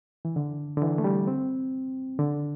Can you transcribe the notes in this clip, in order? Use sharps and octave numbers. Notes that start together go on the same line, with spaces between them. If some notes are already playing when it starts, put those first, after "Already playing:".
E3
D3
D3
E3
A3
G3
C4
D3